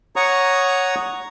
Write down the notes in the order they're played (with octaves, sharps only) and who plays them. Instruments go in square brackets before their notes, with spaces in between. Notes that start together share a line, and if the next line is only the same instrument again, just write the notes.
[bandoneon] C#5 F#5 A#5 C#6 D#6